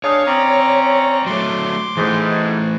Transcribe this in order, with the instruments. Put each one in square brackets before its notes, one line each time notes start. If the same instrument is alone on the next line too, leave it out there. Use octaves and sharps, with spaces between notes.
[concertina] D4 G#4 [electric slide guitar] C#5 [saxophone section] D#5 F5
[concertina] C4 A#5 [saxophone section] C#4 D5
[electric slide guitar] F#3 A3 [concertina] C6 D6
[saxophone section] G#2 [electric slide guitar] E3 A3